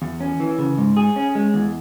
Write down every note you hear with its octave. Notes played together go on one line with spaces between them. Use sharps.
E2
C#4
E3
C#3
G#2
G#4
C#4
G#3
E2